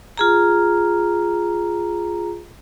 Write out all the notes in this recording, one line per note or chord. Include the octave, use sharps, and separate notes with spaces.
F4 G#4 A#5